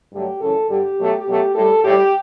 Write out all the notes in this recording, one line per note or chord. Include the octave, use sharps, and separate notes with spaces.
G2 D3 F#3 A3 G4
F#2 C#3 E3 A3 A4
G2 D3 G3 G4
B2 F#3 A3
B2 F#3 A3
A2 G3 A4
A2 G3 G4